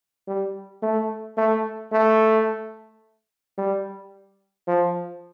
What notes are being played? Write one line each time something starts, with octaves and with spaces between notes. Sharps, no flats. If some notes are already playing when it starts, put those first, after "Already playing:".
G3
A3
A3
A3
G3
F3